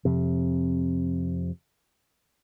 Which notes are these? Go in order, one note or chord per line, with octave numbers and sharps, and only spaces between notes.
F2 C3